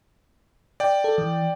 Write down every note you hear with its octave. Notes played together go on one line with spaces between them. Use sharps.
D5 G5
A4
E3